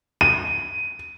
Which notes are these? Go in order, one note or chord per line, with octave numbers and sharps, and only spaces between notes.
D#7